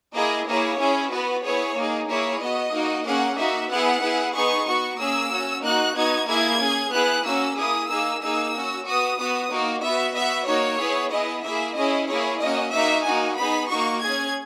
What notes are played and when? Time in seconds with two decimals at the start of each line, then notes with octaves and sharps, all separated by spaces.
0.15 A#3 E4 G#4 D#5
0.47 A#3 E4 G#4 C#5
0.79 C#4 E4 G#4
1.11 B3 F#4 B4
1.44 B3 E4 G#4 C#5
1.76 A#3 D#4 G#4
2.08 A#3 E4 G#4 C#5
2.40 B3 F#4 D#5
2.73 A#3 D#4 F#4
3.05 A#3 C#4 G#4 F#5
3.37 A#3 D#4 F#4 E5
3.70 B3 E4 G#4 F#5
4.02 B3 E4 G#4
4.34 B3 D#4 G#4 C#6
4.66 B3 F#4 C#6
4.99 A#3 C#4 G#4 E6
5.31 C#4 F#4
5.63 A#3 D#4 F#4 F#6
5.95 B3 D#4 F#4 G#6
6.27 A#3 E4 G#4 G#6
6.60 C#4 G#4
6.92 B3 E4 G#4 F#6
7.24 A#3 C#4 F#4 E6
7.57 A#3 E4 G#4 D#6
7.89 A#3 D#4 G#4 E6
8.21 A#3 D#4 G#4 E6
8.54 C#4 F#4
8.86 B3 F#4 D#6
9.18 B3 F#4 D#6
9.51 A#3 D#4 F#4
9.82 B3 F#4 E5
10.15 B3 F#4 E5
10.47 A#3 D#4 F#4 C#5
10.79 B3 E4 G#4
11.11 B3 E4 G#4 D#5
11.44 A#3 E4 G#4 E5
11.76 C#4 E4 G#4 D#5
12.08 A#3 E4 G#4 C#5
12.40 A#3 C#4 F#4 D#5
12.72 A#3 D#4 F#4 E5
13.05 A#3 D#4 F#4 G#5
13.37 B3 D#4 G#4 B5
13.69 A#3 D#4 F#4 C#6
14.02 C#4 G#4 G#6